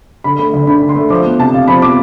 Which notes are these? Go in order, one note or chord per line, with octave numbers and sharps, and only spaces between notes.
D3 B5
A3 B5
D2
D4 B5
D3
C6
A3
F3 D6
B3
C3 A5
C3 F5
F3 B5
B3 D6